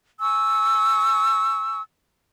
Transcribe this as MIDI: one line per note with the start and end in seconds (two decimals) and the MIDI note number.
0.21 1.81 80
0.21 1.81 85
0.21 1.81 88